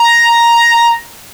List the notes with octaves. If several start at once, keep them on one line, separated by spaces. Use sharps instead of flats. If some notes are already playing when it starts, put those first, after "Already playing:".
Already playing: A#5